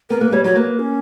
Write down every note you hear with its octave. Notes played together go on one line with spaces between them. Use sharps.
B3 A#4
A#3 B4
G3 C#5
F#3 C#5
A#3 B4
C#4